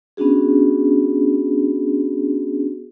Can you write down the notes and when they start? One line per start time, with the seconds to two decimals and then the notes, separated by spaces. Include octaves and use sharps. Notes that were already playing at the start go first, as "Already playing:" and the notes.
0.17 B3 C#4 D4 F#4 G#4